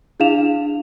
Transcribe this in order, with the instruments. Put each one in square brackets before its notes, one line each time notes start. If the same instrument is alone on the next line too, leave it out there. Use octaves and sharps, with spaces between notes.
[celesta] D4 E4 G#4 F5 E7 F7